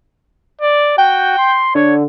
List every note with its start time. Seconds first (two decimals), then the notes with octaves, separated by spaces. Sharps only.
0.61 D5
0.98 F#4 G5
1.38 C6
1.75 D3 C#5